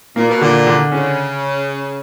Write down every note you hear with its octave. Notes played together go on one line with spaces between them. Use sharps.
A#2 A#3
B2
A#2 D3
D3
C#3 C#4